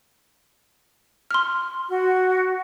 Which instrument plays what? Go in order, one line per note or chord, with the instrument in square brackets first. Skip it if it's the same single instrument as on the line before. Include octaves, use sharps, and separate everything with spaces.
[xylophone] C6 F6
[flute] F#4